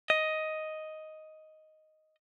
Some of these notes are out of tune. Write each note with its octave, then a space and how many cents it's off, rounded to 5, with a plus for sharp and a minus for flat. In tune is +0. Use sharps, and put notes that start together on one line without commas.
D#5 +5